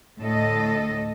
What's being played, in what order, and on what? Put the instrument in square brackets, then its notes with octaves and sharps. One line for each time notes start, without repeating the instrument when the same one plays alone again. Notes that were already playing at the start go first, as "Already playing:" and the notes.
[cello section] D2 A2 A4 D#5